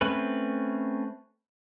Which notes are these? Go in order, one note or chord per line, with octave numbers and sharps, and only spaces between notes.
A3 C4 C#4 B4